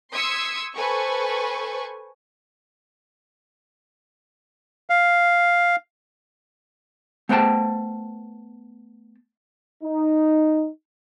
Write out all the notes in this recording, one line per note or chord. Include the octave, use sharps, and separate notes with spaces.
C6 D#6 E6 G#6 B6 C#7
A4 B4 C5 G#5 C#6
F5
A3 B3 C5 G5 A5
D#4